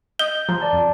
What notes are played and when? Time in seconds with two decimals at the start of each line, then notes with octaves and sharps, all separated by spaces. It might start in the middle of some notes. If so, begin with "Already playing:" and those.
0.19 D#5 G6 G7
0.49 F3 A#5
0.61 D5 A5
0.73 F2